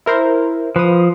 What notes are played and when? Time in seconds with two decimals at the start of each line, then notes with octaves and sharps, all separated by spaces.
0.06 E4 A#4 C5
0.76 F3 B4 D#6